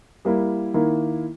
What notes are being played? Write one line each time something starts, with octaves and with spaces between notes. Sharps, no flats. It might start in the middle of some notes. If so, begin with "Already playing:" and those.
G3 A#3 E4
D#3 A#3 E4